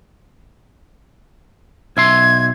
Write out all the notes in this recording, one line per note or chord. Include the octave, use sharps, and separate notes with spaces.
B1 E5 C6 G#6